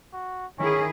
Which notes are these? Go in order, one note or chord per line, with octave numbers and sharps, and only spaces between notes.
F#4
D#3 C#4 E4 G#4